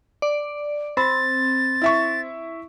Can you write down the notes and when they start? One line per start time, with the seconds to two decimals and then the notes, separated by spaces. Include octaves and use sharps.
0.22 D5
0.97 C4 B5 A6
1.82 E4 E5 C#6